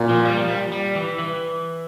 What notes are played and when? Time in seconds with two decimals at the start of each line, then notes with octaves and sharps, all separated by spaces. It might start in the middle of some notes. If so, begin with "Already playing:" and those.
Already playing: A#2
0.09 F3
0.25 G3
0.37 F3
0.48 G3
0.72 G3
0.95 E3
1.18 E3